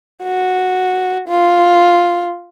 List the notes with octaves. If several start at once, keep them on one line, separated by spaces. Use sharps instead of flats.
F#4
F4